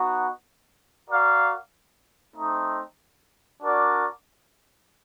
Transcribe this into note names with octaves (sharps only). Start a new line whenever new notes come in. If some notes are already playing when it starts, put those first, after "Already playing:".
Already playing: B3 D#4 F#4
F#4 A#4 D5 F5
A3 C4 D#4
D4 F#4 A#4 D5